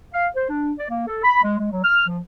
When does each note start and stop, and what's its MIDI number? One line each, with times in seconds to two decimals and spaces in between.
0.13 0.27 77
0.35 0.47 72
0.49 0.72 62
0.78 0.85 74
0.89 1.05 58
1.07 1.22 69
1.24 1.42 83
1.42 1.55 56
1.58 1.69 56
1.71 1.80 54
1.84 2.04 89
2.07 2.19 53